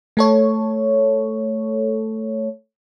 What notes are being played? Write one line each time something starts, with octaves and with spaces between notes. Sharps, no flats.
A3 A4 C#5